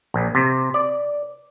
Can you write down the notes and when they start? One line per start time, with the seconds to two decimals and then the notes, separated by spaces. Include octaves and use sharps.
0.14 A#1
0.35 C3
0.74 D5